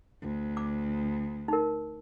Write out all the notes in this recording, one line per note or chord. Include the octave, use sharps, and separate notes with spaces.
D2
D6
D#4 A#4